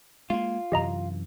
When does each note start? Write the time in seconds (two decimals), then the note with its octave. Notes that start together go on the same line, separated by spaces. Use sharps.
0.30 G#3 A#3 F4
0.72 F#2 C3 E3 G4 D#5 A#5